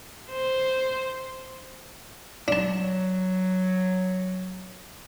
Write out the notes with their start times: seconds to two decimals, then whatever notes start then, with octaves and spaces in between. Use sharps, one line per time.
0.31 C5
2.48 F#3 D4 A5